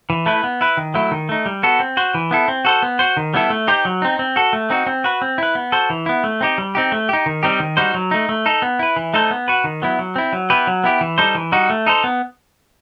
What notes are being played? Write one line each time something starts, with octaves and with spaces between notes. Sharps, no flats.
E3
A3 E4 B4
B3
E4 B4
D#3
F#3 A3 E4
D#3
A3 D#4
G3
B3 F#4 A4
C4
F#4 C5
E3
B3 E4 A4
C4
F#4 A4 C5
B3
F#4 C5
D#3
G3 B3 E4 A4
A3
D#4 G4 C5
F#3
C4 D#4
C4
F#4 A4
A3
C4 D#4 F#4
C4
F#4 B4
C4
E4 B4
B3
F#4 A4 C5
E3
B3 E4
A3
C4 D#4 G4
G3
C4 D#4 G4
A3
D#4 G4
D#3
G3 C4 D#4 G4
D#3
G3 D#4 F#4 C5
F#3
A3 D#4
A3
D#4 A4
B3
E4 B4
E3
A3 D#4 A4 C5
B3
F#4 B4
D#3
F#3 B3 E4
F#3
C4 E4
F#3
B3 E4 G4 B4
F#3
B3 E4 G4
E3
G3 D#4 A4 C5
E3
G3 D#4 F#4
A3
D#4 A4 C5
B3